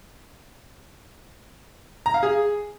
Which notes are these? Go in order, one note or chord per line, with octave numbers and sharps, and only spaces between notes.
A#5
F5
G#4